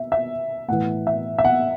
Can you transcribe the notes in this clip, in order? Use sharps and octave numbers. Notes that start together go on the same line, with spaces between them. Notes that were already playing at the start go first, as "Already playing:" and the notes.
Already playing: E5
E5
A2 E3 F#5
E5
E5
F#5